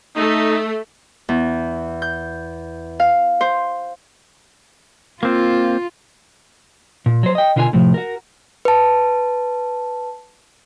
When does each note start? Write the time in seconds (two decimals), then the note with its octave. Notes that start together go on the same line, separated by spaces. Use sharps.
0.16 A3 D#4
1.29 E2
2.02 G6
3.00 F5
3.41 C5
5.23 A#3 C4 F4
7.06 A#2
7.23 F#3 C5
7.35 D#5 G5
7.56 B2 D3 F4 A#4 B4 G#5
7.73 A2 C3 F3
7.94 F#4 A#4
8.65 B4 A5